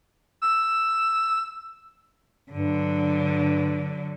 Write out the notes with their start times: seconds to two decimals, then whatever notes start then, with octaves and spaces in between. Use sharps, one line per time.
0.42 E6
2.52 G2 D3 F#3